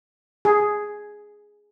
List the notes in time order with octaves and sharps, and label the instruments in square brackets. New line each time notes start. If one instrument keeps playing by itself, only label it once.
[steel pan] G#4